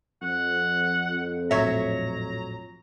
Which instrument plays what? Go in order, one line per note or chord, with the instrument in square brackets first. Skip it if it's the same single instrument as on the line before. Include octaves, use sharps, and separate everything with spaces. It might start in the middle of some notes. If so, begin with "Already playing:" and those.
[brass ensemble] F2 [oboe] F#5
[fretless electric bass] A#1 A2 [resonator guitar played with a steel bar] F#3 C#5 E5 [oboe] A#5